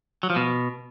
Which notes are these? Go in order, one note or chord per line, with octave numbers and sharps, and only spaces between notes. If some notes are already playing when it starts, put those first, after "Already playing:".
F#3
F3
B2